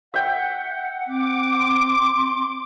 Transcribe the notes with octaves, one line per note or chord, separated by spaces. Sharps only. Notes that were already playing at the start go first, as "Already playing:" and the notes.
E5 F#5 G5
C4 D6
C6